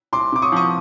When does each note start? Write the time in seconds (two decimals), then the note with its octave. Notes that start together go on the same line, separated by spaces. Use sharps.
0.13 C2 C6 D6
0.32 C3 D6
0.42 C#6 D#6
0.52 F3 C#6 D#6